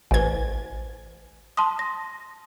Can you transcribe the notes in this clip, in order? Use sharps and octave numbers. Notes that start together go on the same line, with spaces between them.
A1 B4 C5 G#5 G#6
A5 C6 D#6
A#6